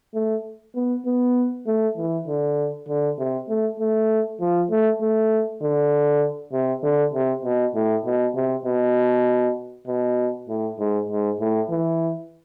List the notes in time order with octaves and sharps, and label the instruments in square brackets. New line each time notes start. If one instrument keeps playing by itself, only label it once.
[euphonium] A3
B3
B3
A3
E3
D3
D3
C3
A3
A3
F3
A3
A3
D3
C3
D3
C3
B2
A2
B2
C3
B2
B2
A2
G#2
G#2
A2
E3